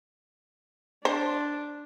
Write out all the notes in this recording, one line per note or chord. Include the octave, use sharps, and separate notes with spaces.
D4 C5